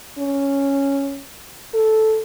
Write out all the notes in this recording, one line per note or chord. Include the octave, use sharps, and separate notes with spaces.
C#4
A4